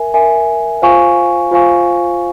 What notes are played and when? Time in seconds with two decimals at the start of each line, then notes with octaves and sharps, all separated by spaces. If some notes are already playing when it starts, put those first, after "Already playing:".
Already playing: A#4 E5 G#5
0.14 A#4 E5 G#5
0.82 F4 C5 F5 G#5 C#6
1.51 F4 C5 F5 G#5 C#6